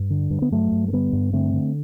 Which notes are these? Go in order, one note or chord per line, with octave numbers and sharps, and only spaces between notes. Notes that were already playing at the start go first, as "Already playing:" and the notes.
Already playing: G2
D3
G2
B3
G2 F#3 A3
G2
A3
D3 G3 B3
G2
D3 A3 C4
D3